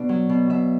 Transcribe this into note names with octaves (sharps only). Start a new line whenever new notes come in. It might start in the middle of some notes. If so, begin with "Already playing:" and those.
Already playing: B2 D4 F#5
F#3
B2
B2 E5